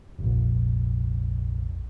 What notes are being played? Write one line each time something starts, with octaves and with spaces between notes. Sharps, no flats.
F1 A#1